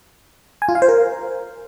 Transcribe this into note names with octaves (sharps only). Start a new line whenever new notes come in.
G#5
F4
F5
C5
A#4